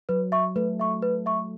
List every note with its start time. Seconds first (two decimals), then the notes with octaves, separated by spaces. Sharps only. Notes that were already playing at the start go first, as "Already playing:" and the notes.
0.09 F#3 B4
0.32 E5 C#6
0.56 A3 B4
0.79 E5 C#6
1.02 B4
1.26 E5 C#6